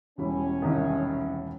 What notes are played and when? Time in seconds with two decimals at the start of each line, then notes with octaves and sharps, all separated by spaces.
0.18 E1 G3 C#4 E4
0.62 C2 D#3